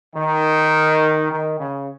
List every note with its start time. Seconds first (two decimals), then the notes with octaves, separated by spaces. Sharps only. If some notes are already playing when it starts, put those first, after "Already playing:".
0.15 D#3
1.31 D#3
1.59 C#3